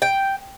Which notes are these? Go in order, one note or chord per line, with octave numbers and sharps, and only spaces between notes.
G5